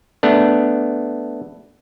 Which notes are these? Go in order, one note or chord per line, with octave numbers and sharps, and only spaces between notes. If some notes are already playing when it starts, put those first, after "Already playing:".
A3 B3 D4